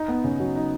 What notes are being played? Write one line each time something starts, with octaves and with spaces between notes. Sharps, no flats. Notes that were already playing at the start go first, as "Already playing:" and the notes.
Already playing: D#4
B3
C#3
F#3
D#4